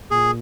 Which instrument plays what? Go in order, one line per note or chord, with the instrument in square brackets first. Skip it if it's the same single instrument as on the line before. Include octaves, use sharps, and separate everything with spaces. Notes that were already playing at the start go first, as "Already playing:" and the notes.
[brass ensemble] A#2 [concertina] G#4